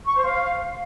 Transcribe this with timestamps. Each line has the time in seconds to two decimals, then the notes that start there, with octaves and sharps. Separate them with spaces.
0.05 C#6
0.14 C5
0.23 F5